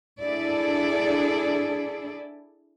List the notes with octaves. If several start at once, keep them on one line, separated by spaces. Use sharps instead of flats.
D4 E4 G#4 A4 D5